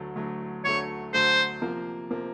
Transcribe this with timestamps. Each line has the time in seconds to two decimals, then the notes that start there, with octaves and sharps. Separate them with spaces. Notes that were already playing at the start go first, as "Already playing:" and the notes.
Already playing: D2 D3 F#3 A3
0.16 D2 D3 F#3 A3
0.64 D2 D3 F#3 A3 C#5
1.13 D2 D3 F#3 A3 C5
1.62 C3 F3 A#3
2.11 C3 F3 A#3